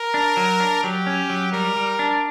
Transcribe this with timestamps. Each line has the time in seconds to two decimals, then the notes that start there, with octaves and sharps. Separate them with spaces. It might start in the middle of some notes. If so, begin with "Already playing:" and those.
Already playing: A#4
0.14 D4
0.37 F#3
0.60 D4
0.84 F#3 G4
1.07 C#4
1.30 F#3
1.53 G3 A#4
1.76 G3
1.99 D4